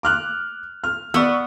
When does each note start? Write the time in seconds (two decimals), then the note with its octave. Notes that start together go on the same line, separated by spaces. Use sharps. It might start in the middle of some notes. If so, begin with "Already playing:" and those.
0.03 D6 F6 F#6
0.84 F6
1.14 B3 D5 C#6 E6